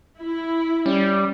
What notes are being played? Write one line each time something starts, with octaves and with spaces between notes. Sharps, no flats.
E4
G3 C#4